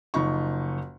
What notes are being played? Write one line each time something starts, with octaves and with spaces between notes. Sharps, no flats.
F#1 F3 D#4 C#6